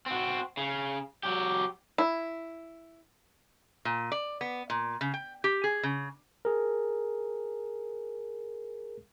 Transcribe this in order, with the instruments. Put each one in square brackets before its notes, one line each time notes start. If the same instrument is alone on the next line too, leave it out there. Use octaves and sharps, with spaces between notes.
[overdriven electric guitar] C4 F#4
C#3
F#3 G4
[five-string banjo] E4
[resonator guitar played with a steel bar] A#2
D5
B3
A#2
C#3
G5
G4
G#4
C#3
[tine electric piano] G#4 A#4